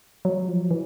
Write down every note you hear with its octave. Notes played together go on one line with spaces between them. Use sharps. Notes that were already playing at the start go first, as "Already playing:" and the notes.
F#3
F3
E3